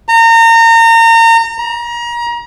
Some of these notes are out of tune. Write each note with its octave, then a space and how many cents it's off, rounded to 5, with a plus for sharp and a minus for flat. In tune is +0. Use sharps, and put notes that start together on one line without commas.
A#5 -30
A#5 +30